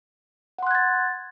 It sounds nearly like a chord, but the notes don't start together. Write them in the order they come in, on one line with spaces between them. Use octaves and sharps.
F#5 C6 F#6 G#6 A6